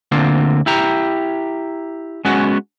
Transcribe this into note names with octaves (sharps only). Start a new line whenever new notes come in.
D2 D3 A#3 C4 F4
E4 G4 A#5
G#3 B3 C#4 F#4